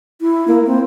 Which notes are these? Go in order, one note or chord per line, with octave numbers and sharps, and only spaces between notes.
E4
A#3
C4